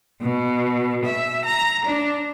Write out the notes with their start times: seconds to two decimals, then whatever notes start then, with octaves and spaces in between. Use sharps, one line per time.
0.22 B2
1.04 E5
1.45 A#5
1.84 D4